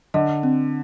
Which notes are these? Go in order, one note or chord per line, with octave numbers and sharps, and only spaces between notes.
D3 D#5
C4